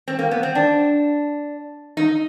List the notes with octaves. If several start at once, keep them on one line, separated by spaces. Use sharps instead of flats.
C4
A#3
B3
C4
D4
D#4